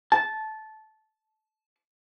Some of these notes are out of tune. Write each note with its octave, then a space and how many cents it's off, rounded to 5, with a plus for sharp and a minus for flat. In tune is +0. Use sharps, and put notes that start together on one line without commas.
A5 -15